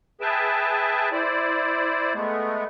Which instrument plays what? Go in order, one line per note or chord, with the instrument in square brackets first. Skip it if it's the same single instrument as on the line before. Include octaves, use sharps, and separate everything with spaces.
[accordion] G#4 B4 E5 G5 A5
E4 C5 D5
G#3 A3 B3